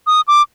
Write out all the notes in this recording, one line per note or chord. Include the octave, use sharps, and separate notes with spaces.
D#6
D6